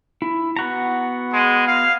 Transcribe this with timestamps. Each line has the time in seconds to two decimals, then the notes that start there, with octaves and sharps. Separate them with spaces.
0.22 E4
0.57 B3 F#4 A#5
1.33 G#3
1.67 F5